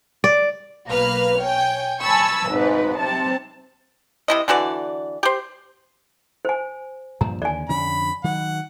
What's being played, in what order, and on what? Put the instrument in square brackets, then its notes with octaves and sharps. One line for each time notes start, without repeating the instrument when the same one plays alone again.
[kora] D5
[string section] B1 A#3 B4 F6
C#5 G5 G#5
G#5 A5 B5 C#6 E6
G#1 G#2 D#4 B4
C3 A5
[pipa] C3 E4 D#5
D3 E3 F#4 D5
G4 C5
[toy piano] C5 G#5
[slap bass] G2 A#2 F3 [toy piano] A#5
[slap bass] D#2 D3 [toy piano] D5 G#5
[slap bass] F2 D3 C#4 [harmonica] B5
[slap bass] D#3 F#3 [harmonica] F#5